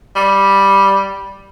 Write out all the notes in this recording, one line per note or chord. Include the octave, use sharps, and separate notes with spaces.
G3